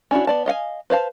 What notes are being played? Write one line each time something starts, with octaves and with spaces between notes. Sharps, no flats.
C#4 D4 E4 F#4
B3 D5 A5
D#5 F5 F#5 G#5
B4 C5 F5 A5